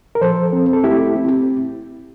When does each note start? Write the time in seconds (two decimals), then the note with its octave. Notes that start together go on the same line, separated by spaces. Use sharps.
0.15 A#4
0.21 F3 A4 C5
0.53 C4
0.73 A4
0.83 A3 E4 G4
1.15 C4